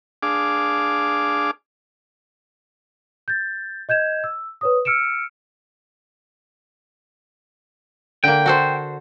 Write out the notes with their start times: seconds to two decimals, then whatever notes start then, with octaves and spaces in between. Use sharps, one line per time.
0.23 D4 G#4 F5 D6
3.28 G6 A6
3.89 D#5 G6 G#6 E7
4.24 E6
4.61 B4 C#5 D#6
4.85 E6 F6 C#7 D7 E7
8.24 D3 A#3 G5
8.46 F#4 A4 C5